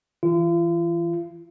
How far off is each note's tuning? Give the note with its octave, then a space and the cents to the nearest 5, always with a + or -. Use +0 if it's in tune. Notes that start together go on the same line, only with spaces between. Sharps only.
E3 +0 F4 -40